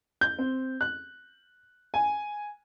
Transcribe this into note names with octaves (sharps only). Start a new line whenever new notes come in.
G6
C4
F#6
G#5